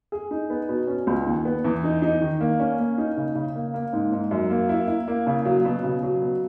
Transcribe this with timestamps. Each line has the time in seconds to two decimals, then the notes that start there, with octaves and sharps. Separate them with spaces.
0.12 G#4
0.31 D#4
0.50 B3
0.69 B2
0.87 C#4
1.07 C#2
1.26 D#2
1.45 B3
1.64 E2
1.84 D#4
2.02 D#4
2.22 D#3
2.41 A#3
2.60 C#4
2.79 A#3
2.98 D#4
3.17 C#3
3.35 C#3
3.55 A#3
3.74 A#3
3.93 G#2
4.12 G#2
4.31 F#2
4.50 A#3
4.69 E4
4.88 E4
5.08 A#3
5.27 C#3
5.45 F#3
5.65 B2
5.84 C#3
6.03 F#3
6.22 B2